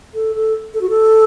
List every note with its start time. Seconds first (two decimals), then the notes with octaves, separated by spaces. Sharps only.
0.14 A4
0.35 A4
0.74 A4
0.81 F#4
0.90 A4